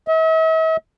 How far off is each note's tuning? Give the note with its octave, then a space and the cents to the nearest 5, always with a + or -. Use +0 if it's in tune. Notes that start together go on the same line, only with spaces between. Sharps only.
E5 -45